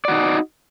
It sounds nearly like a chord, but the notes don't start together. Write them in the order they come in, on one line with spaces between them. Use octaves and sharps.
D5 F#4 D#4